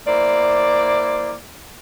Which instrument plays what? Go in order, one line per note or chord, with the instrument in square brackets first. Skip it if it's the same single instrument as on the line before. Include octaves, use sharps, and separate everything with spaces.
[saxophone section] A#3 E4 C5 D5